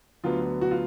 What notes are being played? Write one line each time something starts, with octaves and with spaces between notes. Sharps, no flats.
D2 D3 F#3 B3 F4
F#4
F4